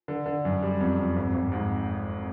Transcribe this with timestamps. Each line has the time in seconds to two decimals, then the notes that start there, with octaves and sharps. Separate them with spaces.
0.08 D3
0.26 D3
0.45 F#2
0.62 G3
0.80 F2
0.98 F2
1.16 G#1
1.34 G#1
1.52 G#2